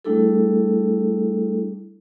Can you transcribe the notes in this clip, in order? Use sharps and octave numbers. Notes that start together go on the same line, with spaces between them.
G3 A3 D4 E4 G#4 A4